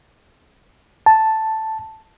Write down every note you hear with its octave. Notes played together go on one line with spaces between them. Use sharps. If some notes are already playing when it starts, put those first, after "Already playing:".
A5